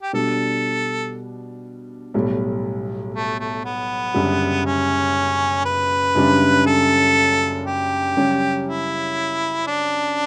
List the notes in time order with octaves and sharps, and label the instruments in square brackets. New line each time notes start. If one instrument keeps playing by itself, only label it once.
[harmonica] G4
[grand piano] B2 G3 D4 [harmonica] A4
[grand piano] B1 A2 G3
[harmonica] A3
A3
B3
[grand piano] F#1 F#2 D3 G3
[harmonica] C#4
B4
[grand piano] F#1 F#2 C#3 G3 D4
[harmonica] A4
G4
[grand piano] F#2 C#3 G3 C#4
[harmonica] E4
D4